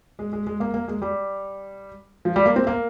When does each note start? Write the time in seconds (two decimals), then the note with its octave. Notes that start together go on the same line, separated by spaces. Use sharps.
0.19 G#3
0.33 G#3
0.47 G#3
0.60 A#3
0.74 A#3
0.88 G#3
1.02 G3
2.25 F3
2.36 G3
2.46 A#3
2.56 C4
2.67 A#3